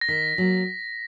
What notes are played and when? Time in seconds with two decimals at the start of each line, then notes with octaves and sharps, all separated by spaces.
0.01 A#6
0.08 D#3 B6
0.38 F#3 A#3